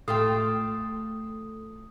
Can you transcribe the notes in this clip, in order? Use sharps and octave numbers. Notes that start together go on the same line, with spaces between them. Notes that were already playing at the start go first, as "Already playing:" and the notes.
A2 A3 F4 A4 G5 C6 D#6